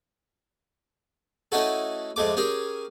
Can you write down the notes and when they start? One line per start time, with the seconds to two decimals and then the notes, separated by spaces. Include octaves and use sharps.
1.52 A3 C#4 D#4 E4 F#4 A4
2.16 F2 G#3 A3 D6
2.37 C#4 G4 G#4 A#4